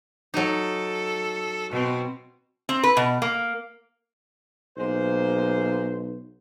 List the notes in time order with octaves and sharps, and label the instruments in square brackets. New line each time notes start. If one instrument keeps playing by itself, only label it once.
[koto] F#3 D#4 [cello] A4
[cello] B2 C4
[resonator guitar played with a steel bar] C4
B4
B2
A#3
[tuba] B1 [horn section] G#3 A#3 C5